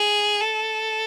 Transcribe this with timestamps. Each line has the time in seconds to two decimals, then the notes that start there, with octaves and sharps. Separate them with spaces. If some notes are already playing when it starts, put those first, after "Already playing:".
Already playing: G#4
0.41 A4